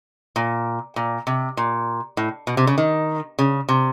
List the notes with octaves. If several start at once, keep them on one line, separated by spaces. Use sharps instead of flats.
A#2
A#2
C3
A#2
A2
B2
C3
C#3
D#3
C#3
C3